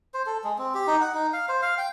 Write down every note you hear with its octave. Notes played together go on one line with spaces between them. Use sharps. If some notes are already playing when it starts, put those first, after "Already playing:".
C5
A4
G#3
C4
G4
D#4
F#5
D#4
F5
C5
F5
G5